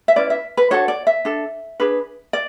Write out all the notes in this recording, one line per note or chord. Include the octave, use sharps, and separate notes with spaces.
E5
C#4 E4 B4 D5
E5
B4
D4 F#4 A4 C#5
D5
E5
D4 A4
D4 G#4 B4
D5